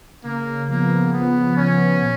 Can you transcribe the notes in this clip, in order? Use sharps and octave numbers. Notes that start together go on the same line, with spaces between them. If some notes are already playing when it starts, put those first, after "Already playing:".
C#3 A#3
F3 A#3 B3
C#3 B3
F3 B3 C#4
A#2